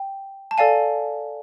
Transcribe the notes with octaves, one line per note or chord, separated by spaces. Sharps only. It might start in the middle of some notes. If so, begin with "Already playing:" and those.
Already playing: G5
A5
A4 D5 F5 G#5